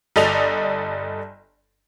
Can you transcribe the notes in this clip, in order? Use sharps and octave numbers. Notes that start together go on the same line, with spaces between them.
G1 A4 D5 D#5 F7